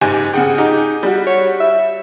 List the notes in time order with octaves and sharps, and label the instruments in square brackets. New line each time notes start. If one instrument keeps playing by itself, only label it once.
[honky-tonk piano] F#1 G#2 G#5 [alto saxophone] G4
[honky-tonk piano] C#3 F#5 G5 [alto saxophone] G#4
[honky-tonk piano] D#4 G4
G3 F#4
[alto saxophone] C#5
E5